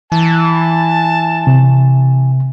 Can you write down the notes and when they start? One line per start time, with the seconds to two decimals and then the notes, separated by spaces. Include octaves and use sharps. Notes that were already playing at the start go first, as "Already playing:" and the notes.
0.12 E3 A5
1.47 C3